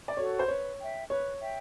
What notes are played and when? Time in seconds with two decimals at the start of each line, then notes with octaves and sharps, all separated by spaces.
0.08 D5
0.17 F#4 A4 C#5
0.39 C5
0.48 B4 C#5
0.79 E5 G5
1.10 B4 C#5
1.40 E5 G5